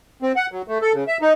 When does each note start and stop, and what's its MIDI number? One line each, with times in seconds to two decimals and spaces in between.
0.22 0.32 60
0.36 0.46 78
0.51 0.62 54
0.68 0.78 57
0.82 0.93 69
0.94 1.04 49
1.08 1.18 76
1.22 1.33 63